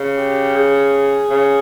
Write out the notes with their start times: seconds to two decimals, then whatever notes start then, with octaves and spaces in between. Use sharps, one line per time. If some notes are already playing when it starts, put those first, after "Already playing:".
Already playing: C#3
0.19 G4
0.55 G#4
1.30 C#3